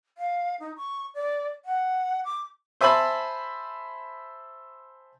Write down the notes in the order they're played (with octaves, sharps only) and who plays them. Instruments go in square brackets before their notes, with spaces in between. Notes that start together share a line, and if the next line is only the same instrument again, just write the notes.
[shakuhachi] F5
D#4
C#6
D5
F#5
D6
[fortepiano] C5 E5 G#5 A5 B5 C6